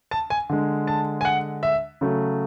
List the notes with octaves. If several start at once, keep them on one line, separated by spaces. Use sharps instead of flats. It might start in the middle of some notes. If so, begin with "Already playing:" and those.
A5
G#5
D3 G#3
A5
G#5
F#5
E5
C#3 F#3 A3